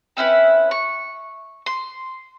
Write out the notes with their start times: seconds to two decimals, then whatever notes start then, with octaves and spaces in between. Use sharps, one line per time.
0.17 C4 C#4 E4 B4
0.71 C#6
1.66 C6